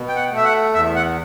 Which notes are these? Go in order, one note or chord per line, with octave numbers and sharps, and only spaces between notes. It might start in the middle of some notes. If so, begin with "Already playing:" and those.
Already playing: B2
G5
F#5
A3
E5
F#5
E2 E5
F#5